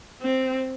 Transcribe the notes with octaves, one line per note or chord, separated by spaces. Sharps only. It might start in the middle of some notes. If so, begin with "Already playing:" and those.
C4